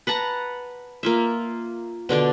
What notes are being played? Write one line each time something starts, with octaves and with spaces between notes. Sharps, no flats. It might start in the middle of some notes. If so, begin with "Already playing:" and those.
B4 F#5 A5 A#5
A#3 F4 E5
B2 D3 D4 D5